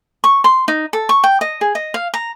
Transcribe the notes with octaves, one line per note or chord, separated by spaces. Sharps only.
C#6
C6
D#4
A4
C#6
G5
D#5
G#4
D#5
F5
A#5